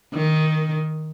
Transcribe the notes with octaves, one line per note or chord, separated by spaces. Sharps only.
D#3